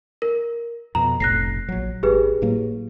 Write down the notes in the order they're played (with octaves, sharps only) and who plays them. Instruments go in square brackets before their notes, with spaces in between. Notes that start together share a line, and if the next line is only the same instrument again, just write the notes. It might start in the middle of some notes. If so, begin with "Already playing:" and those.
[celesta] A#4
[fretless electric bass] F2 B2 [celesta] A#5
[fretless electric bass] F1 B1 A2 [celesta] F#6 A#6 C7
[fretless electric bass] A#1 F#3
[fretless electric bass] G#1 [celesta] G4 G#4 B4
[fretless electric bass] A2 F#3 A#3